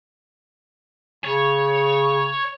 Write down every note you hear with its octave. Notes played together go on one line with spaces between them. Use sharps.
C#3 C#5